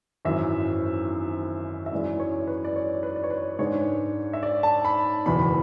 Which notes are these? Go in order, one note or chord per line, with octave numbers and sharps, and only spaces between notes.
G#1 F#2 E3 E5
E5
F#2 E3 G#3 C#4 D5
C#5
B4
D5
C#5
B4
D5
C#5
B4
G#2 G#3 D4 C#5
E5
D5
A5
B5
F#1 E2 B2 B5